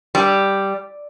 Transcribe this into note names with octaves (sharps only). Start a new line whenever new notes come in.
G3